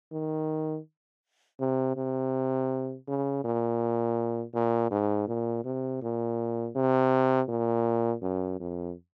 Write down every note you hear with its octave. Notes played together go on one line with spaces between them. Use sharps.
D#3
C3
C3
C#3
A#2
A#2
G#2
A#2
C3
A#2
C3
A#2
F#2
F2